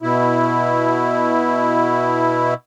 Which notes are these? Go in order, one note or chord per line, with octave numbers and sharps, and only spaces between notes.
B2 E4